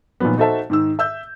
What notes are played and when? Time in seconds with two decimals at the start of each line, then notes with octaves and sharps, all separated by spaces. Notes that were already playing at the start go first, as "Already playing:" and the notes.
0.20 A#2 D#3 F3 F#3 B3
0.37 D#4 F#4 A4 C5 E5 A5
0.70 G#2 D#3 E6
0.99 E5 E6 G6